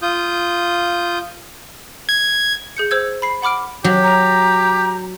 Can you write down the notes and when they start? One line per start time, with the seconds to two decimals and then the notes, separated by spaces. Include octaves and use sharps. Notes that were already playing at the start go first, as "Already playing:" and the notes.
0.02 F4 D#6 G6
2.09 G#6
2.77 G#4 G6 C#7
2.91 C5 E6 G#6
3.22 B5 C7
3.42 F#5 B5 D6 F6 D7
3.84 F#3 G4
4.04 A#5